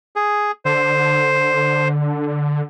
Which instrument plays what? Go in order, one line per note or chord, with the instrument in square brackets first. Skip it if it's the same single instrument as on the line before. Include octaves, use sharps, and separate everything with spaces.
[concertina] G#4
[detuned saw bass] D3 [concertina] C5